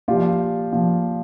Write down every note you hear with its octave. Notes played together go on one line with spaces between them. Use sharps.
A#2 F3 F4 G4
A#2 F3